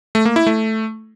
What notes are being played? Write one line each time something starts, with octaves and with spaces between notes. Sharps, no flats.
A3
A#3
E4
A3